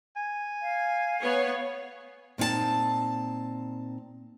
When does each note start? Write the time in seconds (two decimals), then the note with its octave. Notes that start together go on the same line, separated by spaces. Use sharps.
0.16 G#5
0.62 F5
1.21 B3 C#5
2.38 A#2 C4 D#4 E4 A5